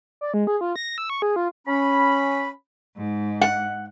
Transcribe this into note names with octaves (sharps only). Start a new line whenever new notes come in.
D5
G#3
G#4
F4
A#6
E6
C#6
G#4
F4
C#4 B5
G#2
F#5